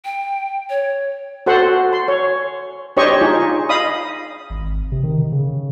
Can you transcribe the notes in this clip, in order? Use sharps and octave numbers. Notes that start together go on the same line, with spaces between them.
G5
C#5
F#4 A4 C5 F#5 C6
C6
C#5
D4 G4 C5 C#5 D#5 C#6
D#4 F4 G#4
D#5 F5 B5 D#6
G#1
C3
D#3
C#3